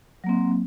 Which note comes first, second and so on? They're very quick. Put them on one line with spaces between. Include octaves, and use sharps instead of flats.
F#3 A#3 C4